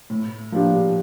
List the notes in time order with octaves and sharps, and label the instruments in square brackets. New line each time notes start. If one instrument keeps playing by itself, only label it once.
[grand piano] A2
F3 A#3 D4 G4